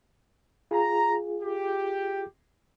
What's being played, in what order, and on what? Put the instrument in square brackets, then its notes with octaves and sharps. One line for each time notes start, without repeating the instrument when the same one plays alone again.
[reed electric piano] F4 G#4 [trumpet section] A#5
[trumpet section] G4